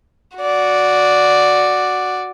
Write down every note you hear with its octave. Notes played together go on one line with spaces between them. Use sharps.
F#4 D5